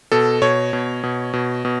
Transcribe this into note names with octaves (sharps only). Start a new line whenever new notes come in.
B2 A4
B2 C#5
B2
B2
B2
B2